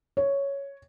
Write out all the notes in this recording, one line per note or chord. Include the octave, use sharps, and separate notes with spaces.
C#5